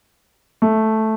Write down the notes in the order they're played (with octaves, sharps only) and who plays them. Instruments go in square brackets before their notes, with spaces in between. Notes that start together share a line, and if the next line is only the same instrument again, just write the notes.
[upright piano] A3